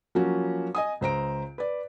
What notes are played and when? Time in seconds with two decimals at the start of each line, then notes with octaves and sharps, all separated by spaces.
0.15 F3 F#3 A#3 C#4 F#4
0.75 D#5 G#5 D#6
1.01 C#2 C5 A#5 D7
1.58 B4 D5